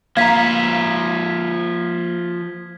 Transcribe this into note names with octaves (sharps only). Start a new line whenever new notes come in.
F3 A#3 B4 F5 A#5 G#6 B6